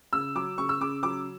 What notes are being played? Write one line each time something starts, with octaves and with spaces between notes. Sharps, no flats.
C#3 E6
F#3 D6
C#3 C#6
E6
C#3 D6
F#3 D6